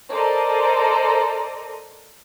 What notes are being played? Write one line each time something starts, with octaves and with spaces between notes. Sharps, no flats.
A4 A#4 C5 D5 D#5 A#5